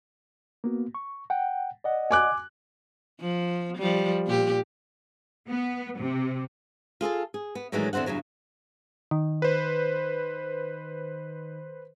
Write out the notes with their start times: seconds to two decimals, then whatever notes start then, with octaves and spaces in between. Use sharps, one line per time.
0.64 A#3 B3 F#4
0.95 C#6
1.30 F#5 G5
1.84 D5 D#5 F#5
2.11 G#5 D6 F#6
3.20 F3
3.78 F3 G3
4.27 A#2 G4
5.48 B3
5.98 C3
7.01 F4 G#4 A4 A5
7.34 G#4
7.55 B3
7.72 A2 D#3 E3 F#3 G#3 D4
7.93 E2 D3 C4 C5 F#5
8.06 E2 G2 C#3 F#3
9.11 D#3
9.42 B4 C5